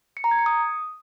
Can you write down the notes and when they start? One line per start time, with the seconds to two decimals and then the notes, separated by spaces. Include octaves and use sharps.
0.17 C#7
0.24 A#5
0.31 G#6
0.39 C#7
0.46 D#6